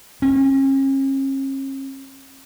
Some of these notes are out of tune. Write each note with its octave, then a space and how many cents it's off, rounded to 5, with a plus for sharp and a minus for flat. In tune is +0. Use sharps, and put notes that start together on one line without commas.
C#4 -40